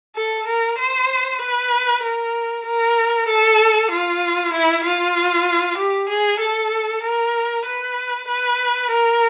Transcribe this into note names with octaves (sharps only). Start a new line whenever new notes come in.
A4
A#4
C5
B4
A#4
A#4
A4
F4
E4
F4
G4
G#4
A4
A#4
B4
B4
A#4